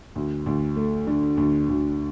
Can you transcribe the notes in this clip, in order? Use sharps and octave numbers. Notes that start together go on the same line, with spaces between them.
D2
D2
A3
D3
D2
D2